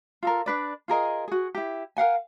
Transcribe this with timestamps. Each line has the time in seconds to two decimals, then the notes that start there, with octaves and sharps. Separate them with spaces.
0.23 F4 A4 A#4
0.46 D4 B4 D5
0.88 F4 G#4 A#4 D#5
1.28 F#4 G#4
1.55 E4 G4
1.97 A#4 F5 F#5 G#5